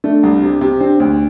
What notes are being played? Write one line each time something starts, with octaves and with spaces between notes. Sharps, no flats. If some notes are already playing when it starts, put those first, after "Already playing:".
A3 D4
C2
C3
C3
C4 D4
D2